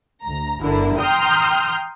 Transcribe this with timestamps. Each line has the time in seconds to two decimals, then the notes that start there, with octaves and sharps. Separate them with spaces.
0.22 D2 A#5
0.62 G1 D3 E4 A#4
0.98 G5 A#5 C6 D#6 F6 G6